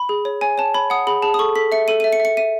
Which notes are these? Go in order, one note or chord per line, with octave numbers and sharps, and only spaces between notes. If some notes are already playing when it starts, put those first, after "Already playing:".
Already playing: B5
G#4
C#5
C#5 G#5
C#5 A5
C#5 B5
F#5 D#6
G#4 B5
G#4 A5
D#6
A4 C#6
A4 B6
E5 C#7
A4 D#7
E5 D#7
C#7
E5
C#7
E5 D#7